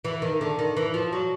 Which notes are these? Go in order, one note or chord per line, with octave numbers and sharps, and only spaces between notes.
E3
D#3
D3
D#3
E3
F3
F#3